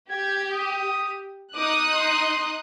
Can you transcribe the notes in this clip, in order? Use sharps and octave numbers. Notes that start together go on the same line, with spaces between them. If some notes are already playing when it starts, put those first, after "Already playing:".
G4 G#6
D#6
D#4 D6 D#6 F#6
C6